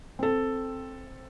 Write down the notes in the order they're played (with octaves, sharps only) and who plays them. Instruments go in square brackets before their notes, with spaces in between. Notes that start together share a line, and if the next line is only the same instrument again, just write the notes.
[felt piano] C4 A4